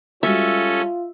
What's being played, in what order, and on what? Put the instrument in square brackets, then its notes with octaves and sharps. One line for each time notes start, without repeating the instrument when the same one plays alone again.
[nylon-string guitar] G3 G#3 F#4 [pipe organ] C#4 A4 [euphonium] F4 [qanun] E5